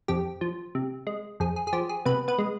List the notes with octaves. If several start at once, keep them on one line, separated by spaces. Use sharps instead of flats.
F2 G4
F3
C3
G#3
F2 G#4
G#4
G#4
F3 G4
G#4
C3 B3 B4
B3 B4
G#3